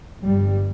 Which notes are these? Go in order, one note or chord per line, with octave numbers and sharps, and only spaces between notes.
G1 G2 G3